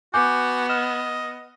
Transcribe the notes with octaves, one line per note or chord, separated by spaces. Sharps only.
B3 F#4 G#5 D6 G6
D#5 F6 E7